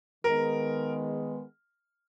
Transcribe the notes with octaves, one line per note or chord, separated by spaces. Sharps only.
D#3 G#3 B3 A#4